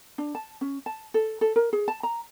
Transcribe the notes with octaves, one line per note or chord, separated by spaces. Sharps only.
D4
A5
C#4
A5
A4
A4
A#4
G#4
A5
A#5